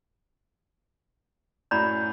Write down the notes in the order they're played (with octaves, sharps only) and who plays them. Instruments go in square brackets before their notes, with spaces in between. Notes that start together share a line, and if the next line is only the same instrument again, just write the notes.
[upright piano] F#2 A2 F#4 [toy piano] D5 A#5 B5 [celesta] G6